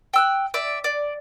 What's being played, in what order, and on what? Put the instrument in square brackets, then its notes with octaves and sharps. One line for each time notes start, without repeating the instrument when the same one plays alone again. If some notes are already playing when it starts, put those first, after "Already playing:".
[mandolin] G5 E6 F#6
D5 E5
D5